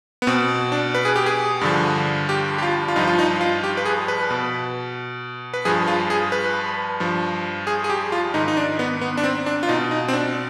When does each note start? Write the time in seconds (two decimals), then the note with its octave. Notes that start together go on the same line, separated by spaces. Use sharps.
0.22 B3
0.27 B2 C4
0.72 D4
0.95 B4
1.05 G#4
1.16 G4
1.26 G#4
1.61 G2 D3 F3
2.29 G4
2.58 G4
2.62 F4
2.88 F4
2.96 G2 F3 D#4
3.07 F4
3.19 D#4
3.41 F4
3.64 G4
3.77 B4
3.85 G#4
4.08 B4
4.30 B2
5.54 B4
5.65 G2 F3 G#4
5.87 F4
6.10 G#4
6.32 B4
7.00 G2 F3
7.67 G#4
7.84 G#4
7.90 G4
8.12 F4
8.34 G#2 D#3 D#4
8.48 D#4
8.57 D4
8.79 B3
9.01 B3
9.17 D4
9.24 C4
9.46 D4
9.63 F4
9.69 B2 D#4
9.91 D#4
10.08 C4
10.13 D4